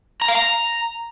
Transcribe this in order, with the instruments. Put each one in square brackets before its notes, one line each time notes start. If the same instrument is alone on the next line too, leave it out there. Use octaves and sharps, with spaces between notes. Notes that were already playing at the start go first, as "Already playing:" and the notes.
[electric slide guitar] A#5
F5
A#5